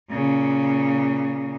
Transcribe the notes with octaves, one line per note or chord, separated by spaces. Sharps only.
A#2 C#3